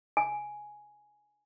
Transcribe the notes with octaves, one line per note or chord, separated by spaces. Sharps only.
G#5